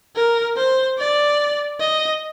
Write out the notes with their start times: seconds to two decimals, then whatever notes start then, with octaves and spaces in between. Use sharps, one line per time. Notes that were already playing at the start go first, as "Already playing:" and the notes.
0.16 A#4
0.56 C5
0.98 D5
1.80 D#5